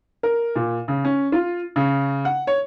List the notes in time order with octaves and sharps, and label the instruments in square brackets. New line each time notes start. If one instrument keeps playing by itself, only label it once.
[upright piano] A#4
A#2
C#3
C#4
F4
C#3
F#5
C#5